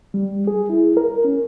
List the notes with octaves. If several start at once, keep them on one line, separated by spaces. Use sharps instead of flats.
G3
G#4
E4
A#4
C#4